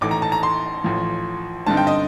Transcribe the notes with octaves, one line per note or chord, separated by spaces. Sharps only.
A1 A2 A3 D#4 D6
A#5
A5
A#5
C6
A1 A2 F3
G2 D3 G3 C4 D#4 A5
G5
D#5